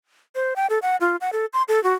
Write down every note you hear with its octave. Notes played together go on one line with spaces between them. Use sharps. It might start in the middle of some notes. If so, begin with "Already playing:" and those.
C5
G5
A4
F#5
F4
F#5
A4
C6
A4
F#4